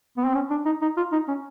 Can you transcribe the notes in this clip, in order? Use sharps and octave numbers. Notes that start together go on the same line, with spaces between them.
B3
C4
C#4
D4
D#4
D#4
F4
D#4
C#4